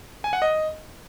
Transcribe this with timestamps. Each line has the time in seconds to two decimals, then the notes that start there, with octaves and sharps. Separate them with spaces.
0.24 G#5
0.33 F#5
0.42 D#5